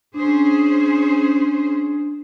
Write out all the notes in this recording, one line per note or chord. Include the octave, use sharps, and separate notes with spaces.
C#4 D4 G#4 C5